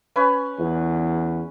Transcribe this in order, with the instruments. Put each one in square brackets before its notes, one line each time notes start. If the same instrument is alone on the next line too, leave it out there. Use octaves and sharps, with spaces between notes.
[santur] C#4 B4 G#5
[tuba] E2